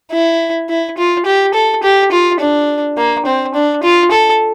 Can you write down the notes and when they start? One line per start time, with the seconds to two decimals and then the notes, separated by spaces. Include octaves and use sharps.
0.12 E4
0.69 E4
0.97 F4
1.26 G4
1.54 A4
1.83 G4
2.12 F4
2.40 D4
2.97 A#3
3.26 C4
3.54 D4
3.83 F4
4.11 A4